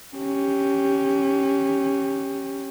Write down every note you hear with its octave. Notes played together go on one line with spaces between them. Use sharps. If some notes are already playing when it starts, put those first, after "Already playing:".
C#4 G4